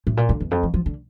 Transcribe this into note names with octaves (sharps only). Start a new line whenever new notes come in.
A2
A#2
D3
E2
F2
E3
F3
D3